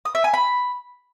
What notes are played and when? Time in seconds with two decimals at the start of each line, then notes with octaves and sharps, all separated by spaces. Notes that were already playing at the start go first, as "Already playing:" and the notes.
0.05 D#6
0.15 E5
0.24 G#5
0.34 B5